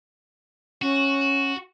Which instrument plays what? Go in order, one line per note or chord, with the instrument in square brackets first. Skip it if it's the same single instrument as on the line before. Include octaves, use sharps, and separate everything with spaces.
[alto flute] C#4 [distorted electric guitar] F#4